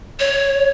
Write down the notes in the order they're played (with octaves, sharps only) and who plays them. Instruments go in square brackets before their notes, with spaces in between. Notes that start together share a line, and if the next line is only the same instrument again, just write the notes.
[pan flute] C#5